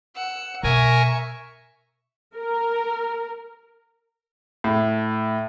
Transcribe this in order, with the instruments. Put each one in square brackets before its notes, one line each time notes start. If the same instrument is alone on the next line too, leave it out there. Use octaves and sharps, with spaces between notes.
[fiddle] F#5 E6
[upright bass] B2 [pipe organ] A#4 G#5 [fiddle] E5 C#6
[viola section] A#4
[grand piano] A2